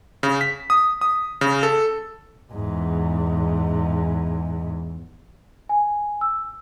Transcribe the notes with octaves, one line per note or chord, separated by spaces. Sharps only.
C#3
B6
D#6
D#6
C#3
A4
E2 G#2
G#5
E6